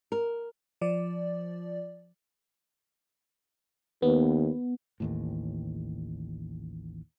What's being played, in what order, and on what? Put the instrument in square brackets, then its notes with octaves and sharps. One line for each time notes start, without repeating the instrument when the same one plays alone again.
[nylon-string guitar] A#4
[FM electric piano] F3 D5
[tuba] D#2 [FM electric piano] B3
[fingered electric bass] A1 D#2 A2